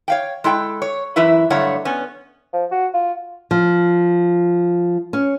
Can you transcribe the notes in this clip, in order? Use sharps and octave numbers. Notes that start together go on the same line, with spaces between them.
C#5 F5 G5
G#3 E4 A4 G5
C#5
F#2 E3 E4 B4 E5
G2 D3 F#3 A3 C#5 F#5
B3 C#4
F3
F#4
F4
F3
C#4